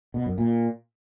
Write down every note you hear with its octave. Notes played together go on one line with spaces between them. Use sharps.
B2
F#2
A#2